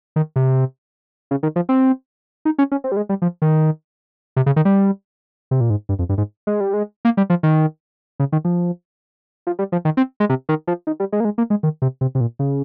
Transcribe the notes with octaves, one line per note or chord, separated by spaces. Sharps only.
D#3
C3
C#3
D#3
F3
C4
D#4
C#4
C#4
C4
G3
G#3
G3
F3
D#3
C3
C#3
D#3
G3
C3
A#2
G#2
G2
F2
G2
G#2
G#3
G3
G#3
A#3
G3
F3
D#3
C#3
D#3
F3
F3
G3
F3
D#3
C4
G#3
C3
D#3
F3
D#3
G3
G#3
A#3
G#3
A#3
G#3
D#3
C3
C3
C3
A#2
C#3